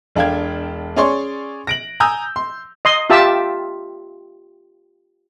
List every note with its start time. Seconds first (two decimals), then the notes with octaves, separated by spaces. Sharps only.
0.16 E1 D4 A4 F5 G5 G#6
0.96 C#4 G#4 C#5 D5 C6 C#6
1.67 A#6 D7 F#7
2.00 G#5 A#5 D#6 E6 G6
2.36 C6
2.85 D#5 C6
3.10 F4 G4 E5 A5 E6